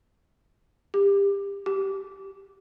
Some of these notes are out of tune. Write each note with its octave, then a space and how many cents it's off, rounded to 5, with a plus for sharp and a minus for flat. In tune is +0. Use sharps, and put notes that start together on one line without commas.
G4 +25
G4 -10